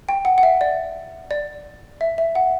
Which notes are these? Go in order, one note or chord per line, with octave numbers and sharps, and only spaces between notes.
G5
F#5
F#5
E5
D5
D5
E5
E5
F#5